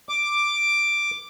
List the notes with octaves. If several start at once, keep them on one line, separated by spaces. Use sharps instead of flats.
D6